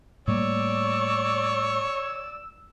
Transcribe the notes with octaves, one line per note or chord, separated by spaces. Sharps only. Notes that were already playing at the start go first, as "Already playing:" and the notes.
A2 G3 A#3 C#5 D5 E6